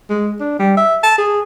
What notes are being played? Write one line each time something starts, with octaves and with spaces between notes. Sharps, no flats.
G#3
D4
G3
E5
A5
G#4